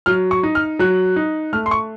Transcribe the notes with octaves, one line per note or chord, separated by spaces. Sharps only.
F#3 F6
C#6
D#4
F6
F#3 F#6
D#4
A3 F6
C6
C#6